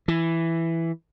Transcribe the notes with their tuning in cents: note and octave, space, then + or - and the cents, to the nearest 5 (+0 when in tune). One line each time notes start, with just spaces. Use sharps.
E3 +5